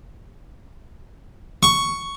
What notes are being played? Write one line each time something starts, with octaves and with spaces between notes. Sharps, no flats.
C#6